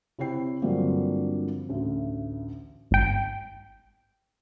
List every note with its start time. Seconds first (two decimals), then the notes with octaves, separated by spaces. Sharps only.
0.19 C3 E4 C#5 G5 C7
0.62 G2 D3 F3 F#3 A#3 C4
1.69 A1 D2
2.91 G#1 G5